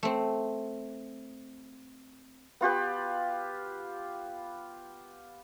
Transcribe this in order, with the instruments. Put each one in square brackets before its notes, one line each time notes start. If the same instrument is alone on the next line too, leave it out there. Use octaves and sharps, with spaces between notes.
[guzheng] A3 C4
[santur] B3 F4 G4 B4